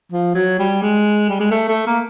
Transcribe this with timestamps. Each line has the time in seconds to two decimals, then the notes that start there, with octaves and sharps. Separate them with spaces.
0.12 F3
0.35 F#3
0.59 G3
0.82 G#3
1.29 G3
1.40 G#3
1.51 A3
1.69 A3
1.86 A#3